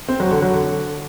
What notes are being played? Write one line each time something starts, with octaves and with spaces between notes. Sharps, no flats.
C4
F#3
D3
F#3
D3